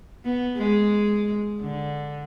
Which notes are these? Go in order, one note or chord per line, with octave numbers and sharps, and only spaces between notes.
B3
G#3
D3